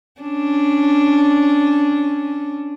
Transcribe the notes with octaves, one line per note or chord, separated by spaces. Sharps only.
C#4 D4